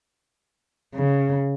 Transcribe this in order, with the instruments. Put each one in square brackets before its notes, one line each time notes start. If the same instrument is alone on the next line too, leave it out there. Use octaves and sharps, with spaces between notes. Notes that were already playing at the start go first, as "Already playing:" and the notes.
[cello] C#3